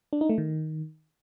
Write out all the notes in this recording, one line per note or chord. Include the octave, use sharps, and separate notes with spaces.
D4
D#4
A3
D#3